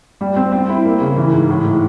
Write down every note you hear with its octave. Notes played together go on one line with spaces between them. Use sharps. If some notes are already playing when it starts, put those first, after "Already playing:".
G3
C4
C4
E4
A#3
C#3
E3
G#2
A2
A2